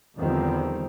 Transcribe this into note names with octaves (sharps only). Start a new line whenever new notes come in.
E2 D3 D#3 F3 G3 C4